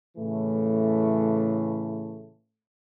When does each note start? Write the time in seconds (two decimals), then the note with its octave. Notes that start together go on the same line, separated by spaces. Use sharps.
0.17 A2 C#3 E3 A3